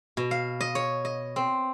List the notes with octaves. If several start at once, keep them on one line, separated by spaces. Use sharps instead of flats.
B2
F5
D#5
C#5
D#5
C4